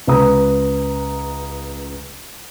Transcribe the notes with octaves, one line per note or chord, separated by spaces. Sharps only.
C#2 B4 A#5 D#6